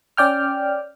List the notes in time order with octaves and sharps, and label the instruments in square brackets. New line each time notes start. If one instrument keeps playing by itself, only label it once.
[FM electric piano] C#4 D5 G5 F6